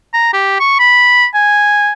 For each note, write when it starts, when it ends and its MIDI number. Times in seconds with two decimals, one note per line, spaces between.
0.13 0.32 82
0.33 0.59 67
0.60 0.74 85
0.79 1.26 83
1.34 1.92 80